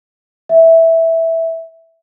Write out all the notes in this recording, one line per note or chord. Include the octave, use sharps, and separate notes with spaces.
E5